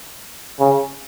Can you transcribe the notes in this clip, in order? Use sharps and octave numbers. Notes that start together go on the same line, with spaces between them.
C#3